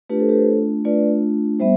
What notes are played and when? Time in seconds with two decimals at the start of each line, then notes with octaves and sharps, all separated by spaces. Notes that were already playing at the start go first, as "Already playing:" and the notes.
0.10 A3 D4 F4 G4 B4
0.20 A4 C5
0.29 G4 B4
0.39 A4 C5
0.85 A3 D4 F4 B4 D5
1.60 G3 B3 C5 E5